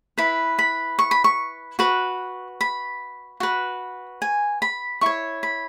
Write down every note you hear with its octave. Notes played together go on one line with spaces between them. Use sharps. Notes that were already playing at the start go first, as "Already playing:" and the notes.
E4 B4 B5
B5
C#6
B5
C#6
F#4 B4
B5
F#4 B4
G#5
B5
E4 C#5 C#6
B5